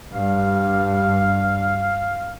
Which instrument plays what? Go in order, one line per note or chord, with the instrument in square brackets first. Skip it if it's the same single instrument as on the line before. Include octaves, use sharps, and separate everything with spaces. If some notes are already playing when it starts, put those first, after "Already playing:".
[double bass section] G2 [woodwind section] F5